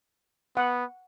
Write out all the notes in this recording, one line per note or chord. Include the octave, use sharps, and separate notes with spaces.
B3 F#5